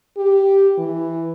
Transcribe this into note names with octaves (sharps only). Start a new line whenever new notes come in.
G4
E3